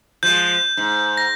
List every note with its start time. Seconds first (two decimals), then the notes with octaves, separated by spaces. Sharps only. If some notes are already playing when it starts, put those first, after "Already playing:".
0.23 F3 G#3 G6
0.77 G#2
1.17 A#6